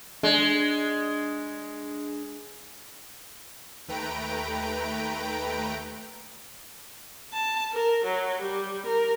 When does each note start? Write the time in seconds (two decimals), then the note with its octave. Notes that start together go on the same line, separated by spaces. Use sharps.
0.23 G#3 D4
3.88 D#2 A3 B4 G5 A#5 D7
7.33 A5
7.73 A#4
8.04 F#3
8.41 G3
8.86 A#4